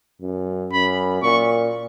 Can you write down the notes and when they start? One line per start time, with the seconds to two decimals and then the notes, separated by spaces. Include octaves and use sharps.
0.21 F#2
0.72 F#2 B5
1.23 A#2 C#6